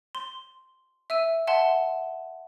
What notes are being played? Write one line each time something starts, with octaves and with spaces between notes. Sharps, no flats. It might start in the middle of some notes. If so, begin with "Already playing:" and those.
C6
E5 E6 D#7
E5 F#5 A5 C6